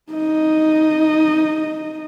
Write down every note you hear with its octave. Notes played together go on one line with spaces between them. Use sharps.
D#4 D#5